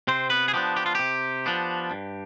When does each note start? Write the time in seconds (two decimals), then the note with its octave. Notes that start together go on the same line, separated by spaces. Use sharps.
0.07 C3 C4 C5
0.30 B3 B4
0.48 G#4
0.54 F3 B3 D4 G4
0.77 G4
0.86 F4
0.95 C3 G4
1.46 F3 B3 D4
1.91 G2